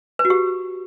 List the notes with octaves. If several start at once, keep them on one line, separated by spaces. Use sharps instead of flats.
B4
F#4
G4